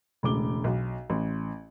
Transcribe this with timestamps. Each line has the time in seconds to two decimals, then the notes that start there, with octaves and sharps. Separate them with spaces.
0.23 E1 C#2 A2 D6 G7
0.64 B1
1.10 A1